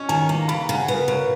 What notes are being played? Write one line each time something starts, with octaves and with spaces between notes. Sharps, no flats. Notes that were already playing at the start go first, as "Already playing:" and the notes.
Already playing: C#4 D#5 C#6
D#3 G#5
A#3 A#5
A#5
C#3 B5
A#5
C#3 F#5
G#5
B3
A#4
C#3 B4